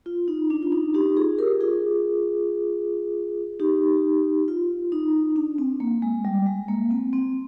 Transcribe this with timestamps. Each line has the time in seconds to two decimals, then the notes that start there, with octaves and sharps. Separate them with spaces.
0.06 F4
0.28 D#4
0.50 D4
0.62 F4
0.72 D#4
0.94 D#4 G4
1.17 F4 G#4
1.38 G4 A#4
1.61 F4 G#4
3.60 D#4 G4
4.48 F4
4.92 D#4
5.36 D4
5.58 C4
5.80 A#3
6.02 G#3
6.25 G3
6.46 G#3
6.68 A#3
6.91 C4
7.13 C4